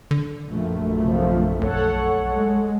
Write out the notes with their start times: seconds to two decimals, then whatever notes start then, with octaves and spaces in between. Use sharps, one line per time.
0.11 D3
0.50 A#1 F#2 A3
1.02 C3 F3
1.61 B1 A4 C#5 F#5
2.33 G#3